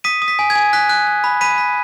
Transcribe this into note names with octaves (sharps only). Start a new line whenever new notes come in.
D#6 B6 D#7
D#6
B6
G#5
G#6
G#5
F#6 B6
F#6
F#6
B5
B5 B6 D#7
B5